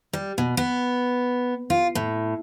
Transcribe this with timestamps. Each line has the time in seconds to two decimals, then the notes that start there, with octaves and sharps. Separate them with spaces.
0.13 G3
0.38 B2
0.57 B3
1.70 F4
1.95 A2